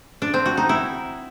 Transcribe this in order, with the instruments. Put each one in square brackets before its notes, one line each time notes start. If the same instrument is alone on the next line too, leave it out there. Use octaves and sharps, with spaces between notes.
[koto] D4
C4
F#4
D#4
E4